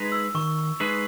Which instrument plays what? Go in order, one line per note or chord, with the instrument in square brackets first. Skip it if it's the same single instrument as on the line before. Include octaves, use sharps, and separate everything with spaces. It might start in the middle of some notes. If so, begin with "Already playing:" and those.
Already playing: [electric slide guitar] G#3 D#4 G#4 B4
[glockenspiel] E6
[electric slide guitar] D#3 [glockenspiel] C#6
[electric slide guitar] G#3 D#4 G#4 B4